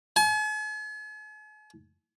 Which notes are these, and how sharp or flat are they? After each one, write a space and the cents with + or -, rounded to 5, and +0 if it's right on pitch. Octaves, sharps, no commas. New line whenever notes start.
G#5 +45